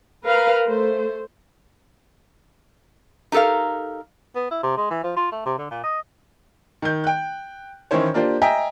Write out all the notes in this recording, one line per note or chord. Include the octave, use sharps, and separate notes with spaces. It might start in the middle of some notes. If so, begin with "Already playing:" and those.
A#4 B4 F5
A3 C5
D#4 G4 A4 A#4 F5
B3
E4
C3
G#3
E3
F3
F4
A3
C3
D3
A#2
D#5
D#3 G6
G5 F#6
D#3 E3 C#4 E4 C5 C#5
A#3 D4 F4 G4 C5
D#5 E5 G5 G#5 A#5 B6